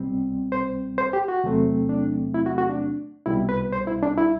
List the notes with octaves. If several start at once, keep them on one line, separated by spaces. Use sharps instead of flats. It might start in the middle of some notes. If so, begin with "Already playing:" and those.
Already playing: C2 B2 G3 C4
C5
C5
G4
F#4
E2 C3 F#3 A3 C4
D4
E4
F#4
F#4
D4
C2 B2 G3 E4
B4
C5
E4
D4
E4